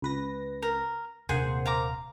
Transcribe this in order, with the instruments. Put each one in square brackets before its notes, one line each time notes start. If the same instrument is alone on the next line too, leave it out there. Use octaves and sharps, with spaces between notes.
[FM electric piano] C#2 B4 A#6
[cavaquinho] A#4
[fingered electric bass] D#1 C3 D4 [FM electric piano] A#3 C5 F#5 [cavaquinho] G#4
[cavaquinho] F5 A#5 D6